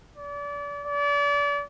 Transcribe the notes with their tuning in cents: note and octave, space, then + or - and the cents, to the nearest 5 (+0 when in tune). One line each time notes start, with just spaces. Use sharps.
D5 -35
D5 -35